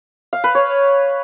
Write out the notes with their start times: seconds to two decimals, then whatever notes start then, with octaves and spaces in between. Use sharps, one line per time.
0.33 F5
0.44 B4
0.55 C#5